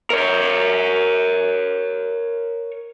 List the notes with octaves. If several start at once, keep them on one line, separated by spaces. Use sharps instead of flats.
A#4 C#5